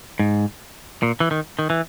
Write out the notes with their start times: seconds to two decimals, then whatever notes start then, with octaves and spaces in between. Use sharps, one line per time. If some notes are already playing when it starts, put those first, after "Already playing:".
0.19 G#2
1.03 A#2
1.20 E3
1.31 D#3
1.59 D#3
1.70 E3